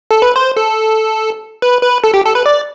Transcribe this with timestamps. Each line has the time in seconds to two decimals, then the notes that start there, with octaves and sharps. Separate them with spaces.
0.11 A4
0.22 B4
0.36 C5
0.57 A4
1.62 B4
1.83 B4
2.04 A4
2.14 G4
2.25 A4
2.35 B4
2.46 D5